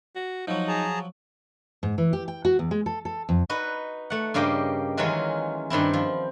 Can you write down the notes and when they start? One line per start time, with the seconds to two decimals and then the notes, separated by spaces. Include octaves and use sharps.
0.16 F#4
0.47 F3 F#3 D#4
0.68 G#4 A5 A#5
1.83 G#2
1.98 E3
2.13 G4
2.28 G5
2.45 F#4
2.59 E2
2.71 G#3
2.86 A4
3.05 A4
3.29 F2
3.49 D#4 F#4 B4
4.10 A3 F#5
4.34 G2 C#3 A#3 G4 D#5
4.97 D#3 E3 F#3 G#3 C#4 F4
5.70 G2 D#3 C4 E4
5.93 F3